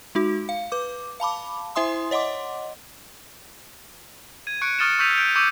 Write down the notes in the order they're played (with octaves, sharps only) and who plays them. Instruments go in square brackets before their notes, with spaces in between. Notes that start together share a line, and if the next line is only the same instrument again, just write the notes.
[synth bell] G#3 D#4 F#4
F5
B4 D6
F5 A5 B5 D6
E4 C5 E5 G#5 C6 D#6
C#5 D#5 F#5 C6 D6
[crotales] G#6 D#7
C#6 F#6 C#7 D7
C#6 D#6 F6 A6 C#7 E7
C#6 E6 G6 B6 D#7 F7
G6 D7
C#6 D6 E6 G6 C#7 D#7